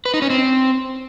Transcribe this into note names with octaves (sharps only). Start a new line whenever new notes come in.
B4
D#4
C#4
C4